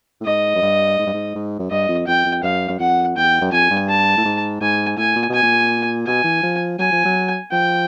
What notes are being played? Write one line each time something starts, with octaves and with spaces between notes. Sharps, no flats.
A2
G#2 D#5
F#2
G2
G#2
G2
G#2
G#2
F#2
G2 D#5
F2
F2 G5
F2
F#2 F5
F#2
F2 F#5
E2 G5
F#2
F2 G#5
G2
A5
A2
G#2
G#2 G#5
A2 G#5
A#2
B2 G#5
A#2
B2 G#5
E3
F3
F#3 G#5
F3
F#3
F3 G5